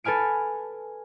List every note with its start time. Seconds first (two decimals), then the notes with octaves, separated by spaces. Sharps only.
0.04 A4 B4 G#5 F6 D7